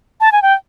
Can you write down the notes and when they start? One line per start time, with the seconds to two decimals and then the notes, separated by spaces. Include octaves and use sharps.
0.21 A5
0.32 G#5
0.42 G5